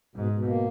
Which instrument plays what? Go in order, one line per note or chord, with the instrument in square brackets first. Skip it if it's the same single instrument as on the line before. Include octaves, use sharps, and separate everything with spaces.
[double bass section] G#2 [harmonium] B2
[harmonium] B2
A#3